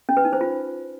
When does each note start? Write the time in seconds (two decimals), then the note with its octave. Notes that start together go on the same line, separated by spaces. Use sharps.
0.09 C#4
0.17 B4
0.25 D#4
0.33 C5
0.41 F4